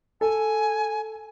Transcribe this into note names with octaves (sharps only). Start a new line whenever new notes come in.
A4 G#5